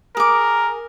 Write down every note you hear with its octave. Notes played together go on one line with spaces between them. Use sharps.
G#4 A#4 D6